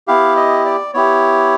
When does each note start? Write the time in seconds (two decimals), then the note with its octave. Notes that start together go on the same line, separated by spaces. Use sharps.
0.08 B3 E4 G4 F5
0.37 D#5
0.65 D5
0.94 B3 E4 G4 C#5